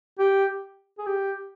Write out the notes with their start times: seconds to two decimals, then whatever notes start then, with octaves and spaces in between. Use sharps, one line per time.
0.19 G4
0.98 G#4
1.06 G4